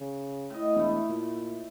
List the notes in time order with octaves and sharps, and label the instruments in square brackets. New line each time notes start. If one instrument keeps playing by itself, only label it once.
[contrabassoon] C#3
[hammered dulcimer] A2 D#5
[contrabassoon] E1 [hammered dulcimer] A3 E4 A4
[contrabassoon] A#2